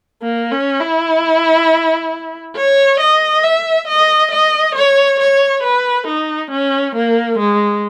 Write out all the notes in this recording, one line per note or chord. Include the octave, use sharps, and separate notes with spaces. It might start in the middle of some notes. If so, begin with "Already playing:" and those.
A#3
C#4
E4
C#5
D#5
E5
D#5
D#5
C#5
C#5
B4
D#4
C#4
A#3
G#3